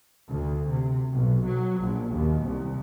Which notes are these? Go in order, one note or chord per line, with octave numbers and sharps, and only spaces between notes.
D2
C3
B1
F#3
A#1
D#2
C2